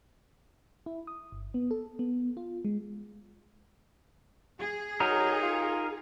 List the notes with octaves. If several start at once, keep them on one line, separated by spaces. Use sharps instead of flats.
E4
D#6
G1
B3
A4
B3
F4
G#3
G#4
F#3 D#4 A#4
F4